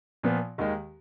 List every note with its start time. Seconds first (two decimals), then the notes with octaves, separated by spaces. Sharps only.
0.23 A#2 F3 B3
0.58 D#2 D#3 G#3